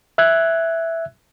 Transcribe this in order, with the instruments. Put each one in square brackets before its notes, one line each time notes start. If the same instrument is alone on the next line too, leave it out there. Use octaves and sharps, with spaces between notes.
[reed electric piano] E5 E6 F#6 G#6